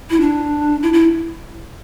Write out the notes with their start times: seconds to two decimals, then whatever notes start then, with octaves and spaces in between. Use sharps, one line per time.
0.10 E4
0.21 D4
0.83 E4
0.93 E4